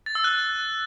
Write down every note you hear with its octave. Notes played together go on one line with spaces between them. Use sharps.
A6
E6
F#6